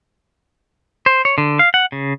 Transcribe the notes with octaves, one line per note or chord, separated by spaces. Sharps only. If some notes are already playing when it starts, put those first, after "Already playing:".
C5
C#5
D3
F5
F#5
C#3